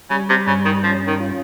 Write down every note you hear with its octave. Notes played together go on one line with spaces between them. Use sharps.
C#3 G3
C3
G2 C#3
D#3
F3 C#4
D#3
F4